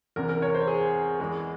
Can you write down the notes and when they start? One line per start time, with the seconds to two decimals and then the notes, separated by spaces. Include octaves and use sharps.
0.16 E2 C3 E3 A#4
0.29 A#4
0.42 C#5
0.55 C5
0.67 G#4
1.20 E2 E3 G#3